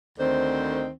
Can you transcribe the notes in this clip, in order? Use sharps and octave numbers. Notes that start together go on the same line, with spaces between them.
D2 D3 D#3 C4 C5